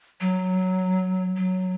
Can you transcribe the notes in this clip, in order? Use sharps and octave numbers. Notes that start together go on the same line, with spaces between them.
F#3
F#3